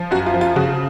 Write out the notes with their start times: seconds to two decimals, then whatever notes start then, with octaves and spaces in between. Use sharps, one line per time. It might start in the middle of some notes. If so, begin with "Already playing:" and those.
Already playing: F3
0.11 F#2 F#4
0.26 F4
0.34 F3
0.41 F4
0.56 C#3 F#4